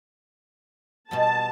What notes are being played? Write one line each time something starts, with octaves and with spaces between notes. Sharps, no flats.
B2 G3 B3 A5